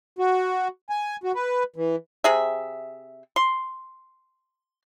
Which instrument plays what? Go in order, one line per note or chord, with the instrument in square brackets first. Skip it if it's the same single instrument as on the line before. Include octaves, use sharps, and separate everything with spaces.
[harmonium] F#4
G#5
F#4
B4
E3
[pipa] C3 G#4 E5
C6